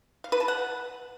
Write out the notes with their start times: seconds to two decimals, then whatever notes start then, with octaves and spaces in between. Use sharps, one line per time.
0.24 F5
0.32 B4
0.40 A5
0.48 F#5